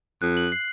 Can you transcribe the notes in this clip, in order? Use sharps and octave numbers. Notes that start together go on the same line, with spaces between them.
F2 F#6
F#7
C7